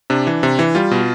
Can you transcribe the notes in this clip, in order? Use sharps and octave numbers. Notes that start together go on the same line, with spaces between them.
C3 D4
E3
C3
E3
G3 F4
B2